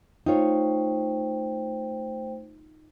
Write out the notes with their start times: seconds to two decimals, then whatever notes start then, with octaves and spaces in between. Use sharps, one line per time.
0.26 A3 D#4 F4 C5 C#5 G5